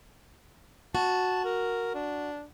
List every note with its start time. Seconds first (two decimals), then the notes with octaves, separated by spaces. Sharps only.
0.95 F#4 A5
1.45 A#4
1.95 D4